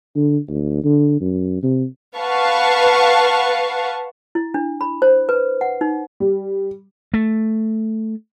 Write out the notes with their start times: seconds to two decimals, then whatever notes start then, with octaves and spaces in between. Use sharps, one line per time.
0.16 D3
0.48 D2
0.84 D3
1.21 F#2
1.63 C3
2.17 B4 F5 F#5 A5 C#6
4.35 E4
4.54 D4
4.81 B5
5.02 C5
5.29 B4
5.61 F#5
5.81 D#4
6.20 G3
7.14 A3